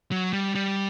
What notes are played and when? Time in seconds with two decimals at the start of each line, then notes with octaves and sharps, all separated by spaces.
0.12 F#3
0.33 G3
0.55 G3